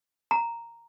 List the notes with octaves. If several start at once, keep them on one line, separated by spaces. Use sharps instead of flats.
A#5